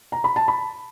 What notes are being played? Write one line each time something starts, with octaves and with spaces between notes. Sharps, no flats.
A#5
B5
A5
B5